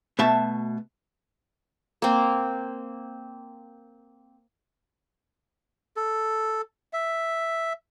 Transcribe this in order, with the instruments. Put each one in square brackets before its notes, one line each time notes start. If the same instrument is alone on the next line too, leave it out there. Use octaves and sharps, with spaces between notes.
[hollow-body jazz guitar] B2 A3 E5 A5
[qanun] A#3 C4
[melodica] A4
E5